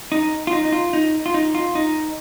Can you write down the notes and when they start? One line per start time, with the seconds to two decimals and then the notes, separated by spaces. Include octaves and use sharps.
0.12 D#4
0.47 F4
0.53 D#4
0.65 D#4
0.72 F4
0.93 D#4
1.26 F4
1.34 D#4
1.55 F4
1.75 D#4